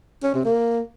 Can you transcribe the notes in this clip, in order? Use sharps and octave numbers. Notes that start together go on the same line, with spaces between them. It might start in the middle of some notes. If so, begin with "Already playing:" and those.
C#4
C3
A#3